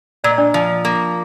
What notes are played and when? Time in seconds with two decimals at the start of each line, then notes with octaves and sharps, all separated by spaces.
0.24 A#2 D5
0.31 D#5
0.38 D4 D5
0.54 F3
0.85 A#3